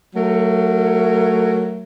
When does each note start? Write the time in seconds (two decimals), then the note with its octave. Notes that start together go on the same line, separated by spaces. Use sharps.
0.15 F#3 A3 A#4